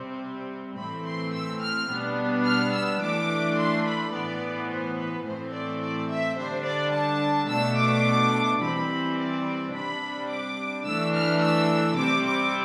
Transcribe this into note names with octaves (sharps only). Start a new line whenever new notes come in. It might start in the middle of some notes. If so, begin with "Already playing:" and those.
Already playing: C3 G3 C4
A2 E3 A3 C4 B5
C6
E6
F6
B2 G3 B3 D4
F6
E6
E3 A3 D4 D6
C6
B5
A2 E3 B3 D5
C5
B4
A2 E3 A3 C4 C5
D5
D5
E5
D3 G3 D4 C5
D5
A5
B2 A3 D4 E6
D6
E3 G3 C4 B5
D5
C3 G3 D4 B5
D6
E3 A3 D4 E6
F6
E6
C3 G3 C4 D6
D6